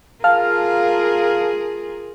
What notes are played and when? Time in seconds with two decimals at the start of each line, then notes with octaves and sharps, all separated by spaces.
0.24 F4 G#4 A#4 F5 A5 F6